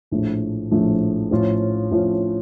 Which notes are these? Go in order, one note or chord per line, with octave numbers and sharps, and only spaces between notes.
A#1 A2 F3 A3
A#1 A2 F3 A3
A2 F3 C#4 F4
A2 F3 C#4 F4